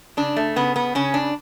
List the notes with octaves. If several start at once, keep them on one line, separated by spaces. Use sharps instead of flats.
C#3 D4
A3
C#3 B3
B3
C#3 C#4
D4